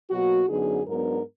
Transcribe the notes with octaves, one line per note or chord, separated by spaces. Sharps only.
B2 F#3 A#3 F#4
F#2 D3 F#3 B3 D#4 G#4
G#2 F#3 B3 D4 A#4